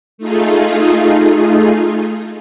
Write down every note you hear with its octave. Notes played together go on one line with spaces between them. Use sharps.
A3 D#4 F4 G#4